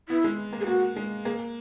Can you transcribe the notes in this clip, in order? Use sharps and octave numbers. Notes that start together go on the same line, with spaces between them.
B3 E4
G#3
A#3
G#4
A#3 F#4
G#3
A#3 G#4